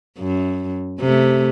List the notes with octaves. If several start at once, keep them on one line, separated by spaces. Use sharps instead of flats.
F#2
C3 A3